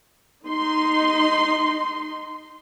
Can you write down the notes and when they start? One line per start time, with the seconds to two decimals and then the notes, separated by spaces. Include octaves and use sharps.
0.45 D#4 C6